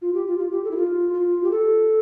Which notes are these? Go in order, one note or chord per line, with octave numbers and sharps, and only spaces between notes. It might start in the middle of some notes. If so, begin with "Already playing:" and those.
F4
G4
F4
F4
G4
A4
E4
F4
F4
G4
A4